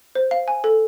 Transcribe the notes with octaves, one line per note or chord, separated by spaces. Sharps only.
C5
F5
G#5
A4